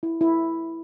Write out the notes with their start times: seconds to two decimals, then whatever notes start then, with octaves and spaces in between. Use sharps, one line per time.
0.03 E4
0.21 E4